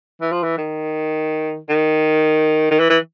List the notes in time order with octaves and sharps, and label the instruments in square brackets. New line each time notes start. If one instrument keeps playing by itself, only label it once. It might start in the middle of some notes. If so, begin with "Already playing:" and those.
[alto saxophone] E3
F3
E3
D#3
D#3
D#3
E3
E3